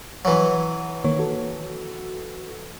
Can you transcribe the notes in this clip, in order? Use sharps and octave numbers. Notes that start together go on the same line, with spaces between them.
E3 F#3
D#3 A#3 C#5
F#4 A4